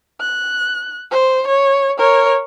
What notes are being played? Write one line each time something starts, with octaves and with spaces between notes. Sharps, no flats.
F#6
C5
C#5
A#4 C#5